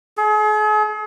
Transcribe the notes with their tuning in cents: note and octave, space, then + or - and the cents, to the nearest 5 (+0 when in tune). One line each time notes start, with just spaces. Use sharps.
G#4 +40